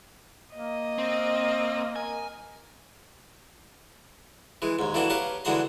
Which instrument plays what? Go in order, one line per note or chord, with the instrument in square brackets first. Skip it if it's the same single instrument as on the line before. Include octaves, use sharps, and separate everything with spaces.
[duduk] A#3 [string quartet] D#5
[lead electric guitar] C4
[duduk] A#4 [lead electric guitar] G#5
[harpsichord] E3 G#3
D#2 G#2
E3 A3 A#3 D4 F#4 A4
G4 A#4 B4 C#5 F5
D3 E3 G#3 F#4 A#5 C6